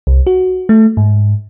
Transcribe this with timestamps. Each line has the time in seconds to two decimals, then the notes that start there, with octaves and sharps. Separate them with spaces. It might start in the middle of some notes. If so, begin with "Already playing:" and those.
0.07 C2
0.27 F#4
0.69 A3
0.97 G#2